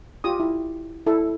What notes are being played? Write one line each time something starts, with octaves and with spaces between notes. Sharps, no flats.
F4 G4 D#6
E4
E4 A4